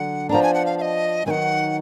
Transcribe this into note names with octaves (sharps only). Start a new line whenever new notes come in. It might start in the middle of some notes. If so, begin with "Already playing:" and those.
Already playing: D3 F#3 F#5
F3 B3 D4 A#5
G#5
F#5
F5
F5
D#5
D#3 F#3 B3 D#4 F#5 G#5